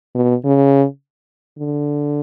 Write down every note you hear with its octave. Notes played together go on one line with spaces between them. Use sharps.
B2
C#3
D3